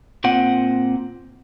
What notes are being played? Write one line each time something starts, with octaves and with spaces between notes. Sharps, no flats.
A#2 C4 F#5